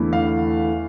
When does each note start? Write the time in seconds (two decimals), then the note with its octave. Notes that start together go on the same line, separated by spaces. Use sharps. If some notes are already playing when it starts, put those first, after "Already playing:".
Already playing: E2 D3 A3 E4
0.13 F5